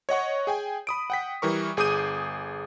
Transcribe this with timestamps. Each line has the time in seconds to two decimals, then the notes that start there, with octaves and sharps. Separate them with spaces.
0.09 C#5 D#5 F#5 C#6
0.47 G#4 G5 G#5
0.87 B5 D#6 D7
1.10 F#5 G5 B6
1.42 E3 G3 A#4 C#6
1.77 G1 G#4 D6 D#6 G6 D#7